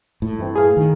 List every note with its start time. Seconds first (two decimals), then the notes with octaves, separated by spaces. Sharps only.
0.22 A2
0.39 G2 E3 C4
0.55 G#4 B4 F5
0.77 D#3